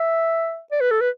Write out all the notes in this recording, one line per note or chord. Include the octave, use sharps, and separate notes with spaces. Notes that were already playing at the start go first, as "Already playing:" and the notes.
Already playing: E5
D5
B4
A4
B4